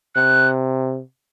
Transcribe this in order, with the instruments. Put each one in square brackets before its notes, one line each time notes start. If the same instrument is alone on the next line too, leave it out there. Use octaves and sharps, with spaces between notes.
[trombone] C3 [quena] F#6